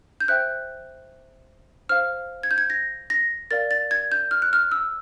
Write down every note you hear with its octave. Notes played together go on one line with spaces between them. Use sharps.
G6
C5 E5 G5 F#6
C5 F5 F6
G#6
G6
G#6
A#6
A#6
A#4 D5 F5 A6
A6
G#6
G6
F6
F#6
F6
E6